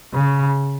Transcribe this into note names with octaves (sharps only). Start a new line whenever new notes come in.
C#3